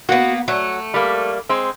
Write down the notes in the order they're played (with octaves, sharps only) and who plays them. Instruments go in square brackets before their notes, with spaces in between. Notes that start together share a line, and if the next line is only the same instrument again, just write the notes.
[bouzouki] A#3 B3 [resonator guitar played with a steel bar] F#4
[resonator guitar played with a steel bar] F#3 [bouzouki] A3
[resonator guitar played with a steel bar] G3 A#3
G#3 C4